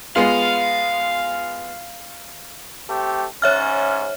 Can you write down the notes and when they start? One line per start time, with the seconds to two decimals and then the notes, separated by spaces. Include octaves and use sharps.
0.16 G#3 B3 F4 F5
2.88 A3 C4 G4
3.42 G#2 C#4 C#5 E5 F6